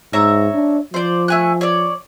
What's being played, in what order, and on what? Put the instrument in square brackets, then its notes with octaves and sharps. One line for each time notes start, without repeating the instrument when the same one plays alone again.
[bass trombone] G#2 [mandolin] C#5 E5 A#5
[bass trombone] D4
[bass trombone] F3 [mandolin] C5 D5
[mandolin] A3 G#5 F#6
C#5 D5